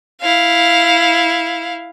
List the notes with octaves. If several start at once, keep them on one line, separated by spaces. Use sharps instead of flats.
E4 F5